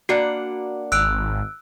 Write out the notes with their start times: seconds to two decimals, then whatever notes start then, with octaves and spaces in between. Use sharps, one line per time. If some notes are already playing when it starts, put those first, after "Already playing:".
0.09 A#3 D4 F#4 F#5
0.92 G#1 E6 F#6 D7